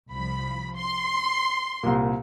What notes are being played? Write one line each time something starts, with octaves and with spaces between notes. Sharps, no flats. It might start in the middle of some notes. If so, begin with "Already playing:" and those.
C2 F3 B5
C6
C2 A#2